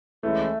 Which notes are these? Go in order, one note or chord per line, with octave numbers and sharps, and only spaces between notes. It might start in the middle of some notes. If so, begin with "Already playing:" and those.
E3 G#3 A3 C#4 E4